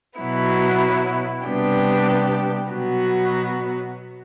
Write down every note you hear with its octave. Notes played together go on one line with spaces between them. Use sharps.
B2 F#3 B3 E4
C3 G3 B3 D4 G4
B2 F#3 B3 F#4